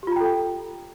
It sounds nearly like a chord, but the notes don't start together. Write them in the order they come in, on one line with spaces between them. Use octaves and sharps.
G4 F4 A#5 G5 A4